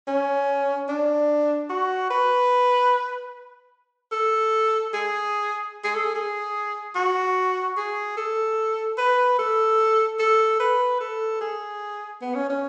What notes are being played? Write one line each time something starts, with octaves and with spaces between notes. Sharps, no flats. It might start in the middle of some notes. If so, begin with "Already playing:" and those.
C#4
D4
F#4
B4
A4
G#4
G#4
A4
G#4
G#4
F#4
G#4
A4
B4
A4
A4
B4
A4
G#4
B3
C#4
C#4